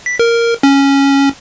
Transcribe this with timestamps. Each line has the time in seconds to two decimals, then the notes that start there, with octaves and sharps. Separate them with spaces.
0.06 B6
0.19 A#4
0.63 C#4